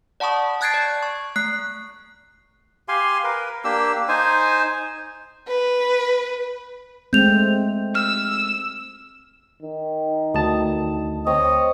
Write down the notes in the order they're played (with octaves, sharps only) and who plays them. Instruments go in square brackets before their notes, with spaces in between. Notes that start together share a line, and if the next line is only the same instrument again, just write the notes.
[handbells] D5 F#5 A5 B5 C#6 D#6
A5 F#6 G#6 A6 C7 D7
D5
C#6
A3 F#6 C7
[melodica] G4 F5 G#5 C6
A#4 B4
A#3 D4 G4 E6
D#4 C5 G#5
[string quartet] B4
[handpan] G#3 A3 C4 [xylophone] G6 F7
[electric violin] E6 [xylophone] F6
[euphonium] D#3
[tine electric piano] D2 A5 [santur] D#6
[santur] C4 C#5 [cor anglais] D#5